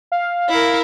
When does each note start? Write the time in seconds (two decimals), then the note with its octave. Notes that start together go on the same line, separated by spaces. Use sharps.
0.12 F5
0.49 E4 A#4